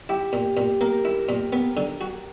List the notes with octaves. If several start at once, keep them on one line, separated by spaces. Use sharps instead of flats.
E4 G4
A#2
A#2
A#3 A#4
E4
A#2
B3
D3
F#4